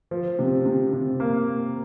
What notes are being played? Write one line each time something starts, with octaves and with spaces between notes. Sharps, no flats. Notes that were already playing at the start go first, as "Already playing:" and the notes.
F3
C3
C3
C3
A#3